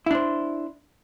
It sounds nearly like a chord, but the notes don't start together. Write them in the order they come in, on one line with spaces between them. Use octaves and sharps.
E4 D4 C5